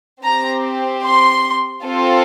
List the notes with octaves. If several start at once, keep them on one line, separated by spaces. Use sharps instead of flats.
C4 G4 A#5
C6
C4 F4 A4